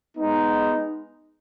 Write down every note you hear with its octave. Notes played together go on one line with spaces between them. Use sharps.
G#3 B3 D#4